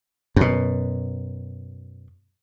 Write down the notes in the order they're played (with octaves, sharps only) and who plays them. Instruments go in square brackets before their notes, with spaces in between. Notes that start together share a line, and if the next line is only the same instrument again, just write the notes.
[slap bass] F#2 B2